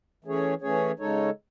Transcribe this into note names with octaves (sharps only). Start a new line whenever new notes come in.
E3 A3 C#4 G#4 C#5
E3 A3 C#4 G#4 C#5
C#3 G#3 D#4 A4 C#5